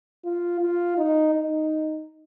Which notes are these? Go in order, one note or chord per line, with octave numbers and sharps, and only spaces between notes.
F4
F4
D#4
D#4